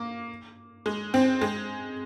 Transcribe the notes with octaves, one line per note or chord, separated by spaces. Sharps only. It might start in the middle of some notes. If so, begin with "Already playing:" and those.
Already playing: A#3
G#3
C4
G#3